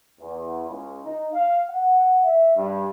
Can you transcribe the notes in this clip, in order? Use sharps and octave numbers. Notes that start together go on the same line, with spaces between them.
E2
C#2
D#4
F5
F#5
E5
G2